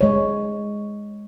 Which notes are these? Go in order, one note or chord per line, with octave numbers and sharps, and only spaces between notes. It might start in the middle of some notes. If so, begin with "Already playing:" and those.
G#3 C#5